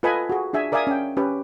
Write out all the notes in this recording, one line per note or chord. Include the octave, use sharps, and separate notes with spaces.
F4 A4 B4 D#5 G#5 B5
F#4 G#4
D4 G#4 E5 G#5
A#4 D5 E5 F5 G#5 D#6
C#4 G5
C#4 G4 B4